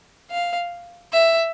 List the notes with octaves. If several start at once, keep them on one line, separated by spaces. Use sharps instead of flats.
F5
E5